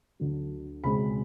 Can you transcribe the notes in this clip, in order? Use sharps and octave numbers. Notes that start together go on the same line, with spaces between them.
D2 D3 F#3
C#2 B2 G#3 C4 B5